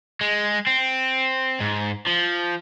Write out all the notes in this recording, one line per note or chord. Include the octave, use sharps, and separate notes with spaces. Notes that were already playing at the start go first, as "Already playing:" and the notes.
G#3
C4
G#2
F3